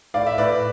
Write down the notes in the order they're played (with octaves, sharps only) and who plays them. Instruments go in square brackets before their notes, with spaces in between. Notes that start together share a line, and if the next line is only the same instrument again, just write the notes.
[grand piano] A2 D5 F5
E5
A2 B4 D5